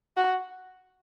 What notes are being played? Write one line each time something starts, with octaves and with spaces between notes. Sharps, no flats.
F#4